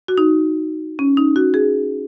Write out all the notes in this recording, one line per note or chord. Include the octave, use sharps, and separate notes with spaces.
F#4
D#4
C#4
D#4
F#4
G#4